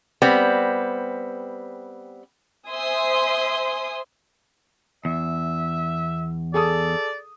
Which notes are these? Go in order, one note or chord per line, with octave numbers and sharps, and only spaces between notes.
G3 B3 C4
C5 E5 G#5 C6 D#6
E2 E5
G#4 A4 D5 D#6